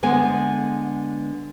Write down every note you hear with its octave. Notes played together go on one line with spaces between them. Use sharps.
D3 G#3 B3 G#5